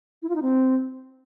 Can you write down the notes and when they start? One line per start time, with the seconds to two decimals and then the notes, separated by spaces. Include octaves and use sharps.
0.22 E4
0.29 F4
0.36 D#4
0.42 C4